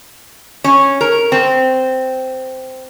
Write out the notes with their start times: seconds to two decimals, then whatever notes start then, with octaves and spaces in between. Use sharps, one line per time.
0.64 C#4
1.01 A#4
1.32 C4